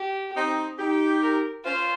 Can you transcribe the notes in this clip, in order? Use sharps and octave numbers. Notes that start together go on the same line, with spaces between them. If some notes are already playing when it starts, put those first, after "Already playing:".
Already playing: G4
C4 D#4
D#4 G4
A#4
C#4 F4 C5